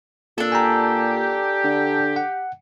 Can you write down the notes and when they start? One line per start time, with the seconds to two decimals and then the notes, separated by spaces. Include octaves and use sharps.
0.38 A#2 D4 A4
0.52 G4 G#5 A#5
1.64 D3
2.16 F#5